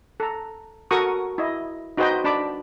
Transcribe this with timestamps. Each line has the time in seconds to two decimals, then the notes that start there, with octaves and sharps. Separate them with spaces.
0.20 A4 A#5
0.91 F#4 A4 A#4 C#6 D#6
1.38 E4 D#5
1.97 D#4 F#4 B4 C5 D#5 G5
2.24 D4 A5 B5 D6